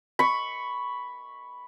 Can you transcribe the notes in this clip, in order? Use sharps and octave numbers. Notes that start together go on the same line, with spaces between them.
B5 C#6